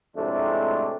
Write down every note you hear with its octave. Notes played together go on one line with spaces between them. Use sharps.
F2 A2 C3 G#3 A3 D4